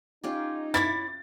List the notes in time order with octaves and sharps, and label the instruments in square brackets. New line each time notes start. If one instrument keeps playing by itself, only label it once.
[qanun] C#4 F4 G4 [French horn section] D#4
[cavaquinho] E4 C#5 D6 [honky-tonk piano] A6